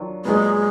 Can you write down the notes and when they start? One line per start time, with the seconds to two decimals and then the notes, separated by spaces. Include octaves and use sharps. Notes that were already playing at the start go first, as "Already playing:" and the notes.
Already playing: D#3 F#3 D4 F4
0.25 A#2 F#3 G#3 B3